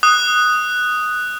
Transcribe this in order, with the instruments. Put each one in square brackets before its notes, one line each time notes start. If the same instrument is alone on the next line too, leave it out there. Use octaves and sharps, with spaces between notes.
[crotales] D#6 F#6